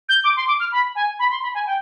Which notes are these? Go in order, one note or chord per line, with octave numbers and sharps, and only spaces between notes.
G6
D6
C6
D6
F6
B5
G#5
B5
C6
B5
G#5
G5